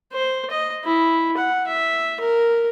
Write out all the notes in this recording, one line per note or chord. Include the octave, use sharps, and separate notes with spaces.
C5
D#5
E4
F#5
E5
A#4